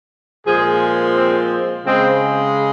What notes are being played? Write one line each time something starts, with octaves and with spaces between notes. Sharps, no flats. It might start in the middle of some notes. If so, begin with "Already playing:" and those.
A#2 F3 G#3 G#4
C4
C#3 G#3 C4